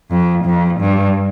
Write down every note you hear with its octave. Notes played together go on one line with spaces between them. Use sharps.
F2
F2
G2